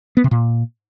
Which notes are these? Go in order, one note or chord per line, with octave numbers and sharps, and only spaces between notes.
B3
C3
A#2